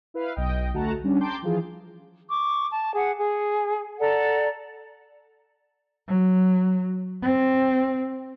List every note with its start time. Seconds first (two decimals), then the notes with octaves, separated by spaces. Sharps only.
0.14 E4 B4 F5
0.36 B1 D#5 G5
0.73 D2 A3 F#4 F#5 A5 A#5
1.04 G3 C#4 D4
1.21 G5 A5 A#5 C6 D6 G6
1.42 E3 F3 F4 G#4
2.30 C#6 D6
2.71 A5
2.95 G#4 F#5
3.18 G#4
3.99 A4 D5 F#5 A#5
6.08 F#3
7.23 C4